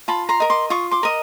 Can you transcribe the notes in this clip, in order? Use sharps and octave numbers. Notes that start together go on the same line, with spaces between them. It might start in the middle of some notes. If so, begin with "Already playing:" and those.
F4 A5 B5
A#5 C6
A#4 D#5
C6 D6
F4 C#6 D#6
C6 D6
A#4 D#5